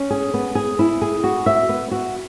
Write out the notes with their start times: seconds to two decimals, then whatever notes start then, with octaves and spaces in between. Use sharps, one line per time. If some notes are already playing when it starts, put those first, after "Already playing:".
Already playing: C#4
0.10 G#4
0.34 B3
0.55 G#4
0.79 E4
1.02 G#4
1.24 F#4
1.46 E5
1.69 B3
1.91 F#4